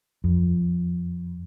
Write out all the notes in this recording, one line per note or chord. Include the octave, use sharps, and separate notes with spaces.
F2